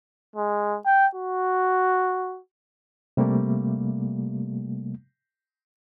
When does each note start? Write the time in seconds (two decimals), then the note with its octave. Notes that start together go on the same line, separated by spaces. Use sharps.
0.36 G#3
0.86 G5
1.15 F#4
3.17 C3 G3 A3 A#3